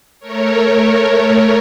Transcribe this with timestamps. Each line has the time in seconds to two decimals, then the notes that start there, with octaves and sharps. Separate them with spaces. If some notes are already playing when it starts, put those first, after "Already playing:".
0.20 A3 A#4 C#5